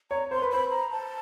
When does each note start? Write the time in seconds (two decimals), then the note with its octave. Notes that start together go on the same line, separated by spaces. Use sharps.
0.11 C#5 A#5
0.31 C5 C6
0.42 B4
0.51 C5 B5
0.71 A#5
0.91 A5